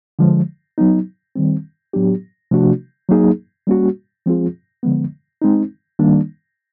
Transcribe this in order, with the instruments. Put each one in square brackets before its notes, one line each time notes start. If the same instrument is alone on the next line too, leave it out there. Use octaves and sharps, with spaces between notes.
[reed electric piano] D3 F3 G#3
F#3 B3 D#4
D#3 G3 C4
A2 F#3 B3 D4 G4
C3 F3 A3 D4 F#4
F#3 A#3 D#4 G#4
G3 A#3 C#4 F#4
F3 G#3 C4 F4 G#4
D3 F3 G#3 B3
G#3 C4 D#4
D#3 G3 A#3 D4